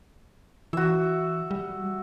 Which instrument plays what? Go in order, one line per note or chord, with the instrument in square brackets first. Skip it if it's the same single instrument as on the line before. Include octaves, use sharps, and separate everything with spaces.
[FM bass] E3 [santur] F#4 E5
[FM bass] G3